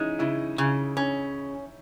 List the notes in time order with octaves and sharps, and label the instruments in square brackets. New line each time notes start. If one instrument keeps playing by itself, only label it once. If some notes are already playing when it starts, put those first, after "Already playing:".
Already playing: [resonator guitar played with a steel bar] G#3 [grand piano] C#4 D#4 E4
[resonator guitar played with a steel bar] C#3 [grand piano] E4
[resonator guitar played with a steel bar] C#3
C#4